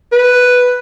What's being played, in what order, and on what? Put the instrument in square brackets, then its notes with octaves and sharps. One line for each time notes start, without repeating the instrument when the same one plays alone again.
[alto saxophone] B4